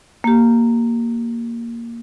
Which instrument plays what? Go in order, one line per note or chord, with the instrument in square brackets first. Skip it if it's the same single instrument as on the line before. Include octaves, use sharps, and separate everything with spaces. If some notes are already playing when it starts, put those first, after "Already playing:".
[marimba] A#3 G4